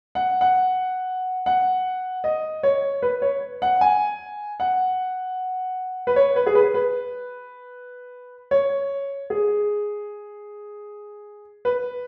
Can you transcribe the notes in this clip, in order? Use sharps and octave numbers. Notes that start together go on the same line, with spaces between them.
F#5
F#5
F#5
D#5
C#5
B4
C#5
F#5
G#5
F#5
B4
C#5
B4
G#4
B4
B4
C#5
G#4
B4